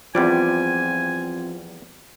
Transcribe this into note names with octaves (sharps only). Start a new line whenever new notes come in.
E2 F3 G3 C4 F4 D5 G#5